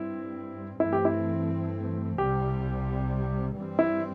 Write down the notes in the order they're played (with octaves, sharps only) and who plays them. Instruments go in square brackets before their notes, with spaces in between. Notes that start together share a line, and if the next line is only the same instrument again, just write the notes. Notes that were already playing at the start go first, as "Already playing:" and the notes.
Already playing: [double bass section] G2 G3 C4 [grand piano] E4
[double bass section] G2 E3 A3 C4 [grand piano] E4
[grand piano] G4
E4
[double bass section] C2 C3 G3 [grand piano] G4
[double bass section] G2 E3 G3 C4
[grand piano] E4